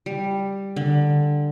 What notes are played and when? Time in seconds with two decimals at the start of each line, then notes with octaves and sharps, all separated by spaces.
0.06 G3
0.76 D3